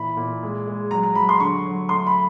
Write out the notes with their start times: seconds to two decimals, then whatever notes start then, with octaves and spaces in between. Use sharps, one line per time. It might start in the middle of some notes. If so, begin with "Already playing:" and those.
Already playing: A#2 E3 B5
0.17 A#2
0.43 G#3
0.67 G#3
0.91 F#3 A#5
1.03 A#5
1.15 F#3 B5
1.29 C6
1.40 D3 C#6
1.66 F#3
1.89 A3 C6
2.07 B5